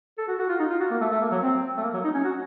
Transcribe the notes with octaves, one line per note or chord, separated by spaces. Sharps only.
A4
F#4
F#4
F4
D#4
F4
F#4
A#3
A3
A3
A#3
F#3
C4
A3
A#3
F#3
D#4
C#4
F#4